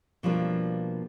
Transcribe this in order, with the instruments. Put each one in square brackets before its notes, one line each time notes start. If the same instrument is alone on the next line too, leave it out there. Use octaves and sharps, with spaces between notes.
[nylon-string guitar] B2 F3 G3 A#3 D4